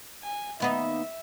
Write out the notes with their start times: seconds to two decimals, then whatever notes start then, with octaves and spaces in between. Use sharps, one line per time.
0.23 G#5
0.60 D#2 B3 D#4 E5